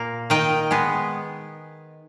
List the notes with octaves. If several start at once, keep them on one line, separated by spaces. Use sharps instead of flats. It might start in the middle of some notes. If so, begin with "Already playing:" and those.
Already playing: A#2 A#3
D#3 D#5 G5
G#3 B3